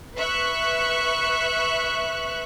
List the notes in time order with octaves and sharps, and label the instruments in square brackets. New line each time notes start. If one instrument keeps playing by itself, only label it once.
[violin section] B4 E5 C#6 F#6